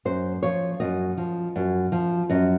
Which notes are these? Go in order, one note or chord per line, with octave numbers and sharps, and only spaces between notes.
F#2 C5
F3 C#5
F#2 D#5
F3
F#2
F3
F#2 D#5